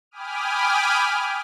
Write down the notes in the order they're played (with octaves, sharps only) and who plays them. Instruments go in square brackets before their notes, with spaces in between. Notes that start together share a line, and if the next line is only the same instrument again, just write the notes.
[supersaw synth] G5 G#5 B5 D6 D#6 F6